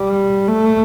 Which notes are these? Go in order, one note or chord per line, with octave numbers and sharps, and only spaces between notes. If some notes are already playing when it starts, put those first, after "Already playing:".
Already playing: G3
A3